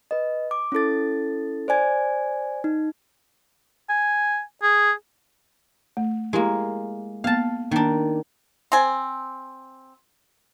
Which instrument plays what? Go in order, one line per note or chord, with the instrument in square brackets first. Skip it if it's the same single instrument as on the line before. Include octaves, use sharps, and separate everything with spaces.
[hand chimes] B4 D#5
D6
C#4 E4 A4 A6
C5 D5 G#5 G#6
D#4
[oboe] G#5
G#4
[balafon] A3
[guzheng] G#3 A#3 [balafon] E4 G4 A#4
[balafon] A#3 B3 [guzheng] F5 A5
[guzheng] D#3 D4 [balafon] A#3
[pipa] C4 G#5